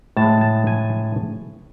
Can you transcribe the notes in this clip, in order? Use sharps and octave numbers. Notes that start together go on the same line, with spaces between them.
A2 G#3 A5
A5
G#5